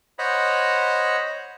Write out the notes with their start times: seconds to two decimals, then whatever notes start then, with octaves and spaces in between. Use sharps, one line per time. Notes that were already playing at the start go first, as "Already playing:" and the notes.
0.19 C5 C#5 D#5 F#5 B5